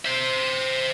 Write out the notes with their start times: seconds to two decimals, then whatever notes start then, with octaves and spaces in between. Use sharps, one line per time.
0.05 C5 E5